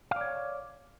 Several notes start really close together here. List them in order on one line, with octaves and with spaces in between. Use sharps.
F5 D5 C#5